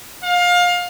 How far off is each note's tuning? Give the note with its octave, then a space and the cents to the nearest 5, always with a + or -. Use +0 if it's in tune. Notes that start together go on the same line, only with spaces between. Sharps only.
F5 +25